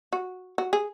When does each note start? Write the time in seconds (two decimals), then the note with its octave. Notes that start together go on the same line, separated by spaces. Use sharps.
0.13 F#4
0.58 F#4
0.73 G#4